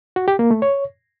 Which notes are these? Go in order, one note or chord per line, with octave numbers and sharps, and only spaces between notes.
F#4
G4
A#3
A3
C#5